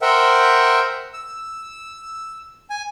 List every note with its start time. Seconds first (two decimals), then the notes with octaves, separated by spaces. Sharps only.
0.02 A#4 C5 E5 F#5 G5
1.14 E6
2.70 G#5